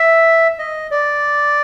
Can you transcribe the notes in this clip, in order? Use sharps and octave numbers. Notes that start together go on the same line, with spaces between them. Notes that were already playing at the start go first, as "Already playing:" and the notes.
Already playing: E5
D#5
D5